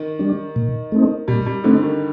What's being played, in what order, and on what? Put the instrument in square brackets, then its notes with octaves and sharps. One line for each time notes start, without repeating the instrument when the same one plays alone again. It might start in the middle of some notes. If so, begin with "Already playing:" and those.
Already playing: [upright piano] D#3
[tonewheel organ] G3 D4
A#2
A3 C4 D#4
[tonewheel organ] A#2 [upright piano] G3
[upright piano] G3
[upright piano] D3 [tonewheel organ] A3 C4 D#4
[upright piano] D#3